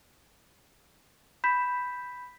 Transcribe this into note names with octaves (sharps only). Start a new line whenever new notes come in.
B5 G6 B6 E7